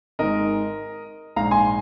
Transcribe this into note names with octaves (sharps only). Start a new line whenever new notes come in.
G#1 G#2 D#3 G#3 A#4 D#5
A#1 G#2 G#3 F5 A#5
G#5 C6